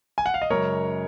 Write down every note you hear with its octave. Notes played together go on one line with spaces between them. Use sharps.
G#5
F#5
F5
D#5
F#2 C#3 G#3 A#4 C#5